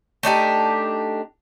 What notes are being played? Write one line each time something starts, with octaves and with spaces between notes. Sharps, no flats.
A3 D4 D#4 G4